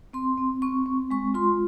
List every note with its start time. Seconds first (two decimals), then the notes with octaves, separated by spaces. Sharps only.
0.13 C4 C6
0.38 C4
0.62 C4 C#6
0.86 C4
1.10 G#3 C#6
1.34 F4 C6